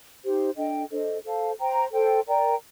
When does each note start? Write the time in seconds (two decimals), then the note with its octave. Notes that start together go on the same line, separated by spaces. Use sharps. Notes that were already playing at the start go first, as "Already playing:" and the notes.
0.23 D#4 G4 C5
0.56 D4 A4 D#5 G5
0.91 D4 A4 C5 D#5
1.24 A4 C5 F5 A5
1.59 C5 G5 A#5
1.93 A4 C5 G5
2.27 A#4 D5 G5 A#5